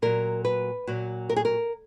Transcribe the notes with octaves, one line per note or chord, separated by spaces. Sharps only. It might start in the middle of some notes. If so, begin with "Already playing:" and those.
A#2 F#3 A#4
B4
A#2 F#3 F#4
A#4
G#4
A#4